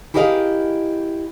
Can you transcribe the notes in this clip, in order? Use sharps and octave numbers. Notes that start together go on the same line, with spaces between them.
E4 G4 G#4 A#4 D#5 F5